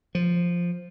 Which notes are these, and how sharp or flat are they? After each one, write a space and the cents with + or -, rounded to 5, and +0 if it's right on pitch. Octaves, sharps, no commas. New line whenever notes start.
F3 +0